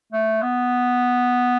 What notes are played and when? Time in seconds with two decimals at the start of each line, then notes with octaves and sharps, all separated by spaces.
0.12 A3
0.42 B3